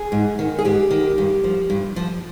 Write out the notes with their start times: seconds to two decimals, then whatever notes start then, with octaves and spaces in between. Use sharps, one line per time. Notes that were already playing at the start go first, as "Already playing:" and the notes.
Already playing: G#4
0.12 G#2
0.39 D#3
0.59 G#4
0.65 G#2 G4
0.91 D#3
1.18 G2
1.44 F3
1.70 G2
1.96 F3